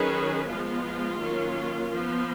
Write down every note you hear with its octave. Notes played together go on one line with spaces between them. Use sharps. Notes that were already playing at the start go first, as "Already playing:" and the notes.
Already playing: D#3 F#3 C#4 G#4 B4
F3 G#3 B3 F4
D#3 F#3 A#3 C#4
F3
B3